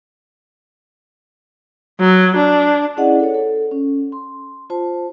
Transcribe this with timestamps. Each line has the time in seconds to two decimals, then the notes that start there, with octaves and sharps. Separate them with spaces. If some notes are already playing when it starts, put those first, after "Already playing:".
2.00 F#3
2.36 D4
2.97 C#4 E4 G#4 D5 D#5 F#5
3.19 A4 C#5
3.34 A4
3.71 C#4
4.12 C6
4.70 F4 C5 A5